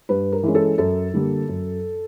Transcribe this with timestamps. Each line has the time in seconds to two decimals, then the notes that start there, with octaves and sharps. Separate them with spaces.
0.09 G2 B4
0.32 A#4
0.43 E3 G#3 C#4
0.55 A4
0.78 F#2 A4
1.14 D3 G3 A#3
1.48 F#2